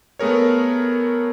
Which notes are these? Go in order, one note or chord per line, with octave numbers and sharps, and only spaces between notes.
A3 B3 G#4 A#4 C#5